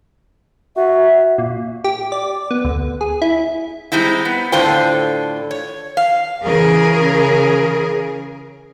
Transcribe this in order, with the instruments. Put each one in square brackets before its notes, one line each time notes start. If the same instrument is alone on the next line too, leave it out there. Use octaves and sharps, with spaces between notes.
[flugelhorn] F#4 [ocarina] E5
[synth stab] A#2
G4
D5
B3
D2
G#4
E4
[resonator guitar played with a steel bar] G3 G#3 C4 D#4 E4
B3
A2 D3 F4 A4 C5 G5
C#5
F5
[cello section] C#3 E3 G#4 A#4